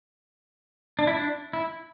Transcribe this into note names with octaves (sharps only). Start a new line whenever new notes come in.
D4
E4
D4
E4